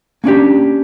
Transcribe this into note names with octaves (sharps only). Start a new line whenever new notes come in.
A#3 C#4 D4 G4